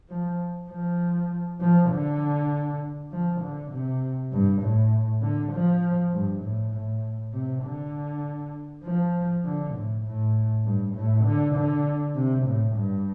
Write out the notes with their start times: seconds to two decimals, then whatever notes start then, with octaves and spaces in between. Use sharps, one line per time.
0.10 F3
0.70 F3
1.61 F3
1.91 D3
3.11 F3
3.41 D3
3.71 C3
4.32 G2
4.62 A2
5.22 D3
5.53 F3
6.13 G2
6.43 A2
6.73 A2
7.33 C3
7.63 D3
8.84 F3
9.45 D3
9.74 A2
10.05 A2
10.65 G2
10.95 A2
11.25 D3
11.56 D3
12.16 C3
12.46 A2
12.76 G2